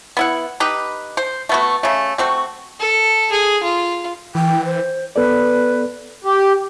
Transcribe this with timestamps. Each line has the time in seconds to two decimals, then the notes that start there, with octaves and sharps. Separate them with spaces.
0.17 B3 E4 F#5
0.60 D#4 G4 B4
1.17 C5
1.49 A3 B3 F#4
1.83 C#3 A3
2.18 A3 C4 F#4
2.80 A4
3.32 G#4
3.63 F4
4.35 E3 G5
4.65 C5
5.16 B3 A4 B4 D5
6.24 G4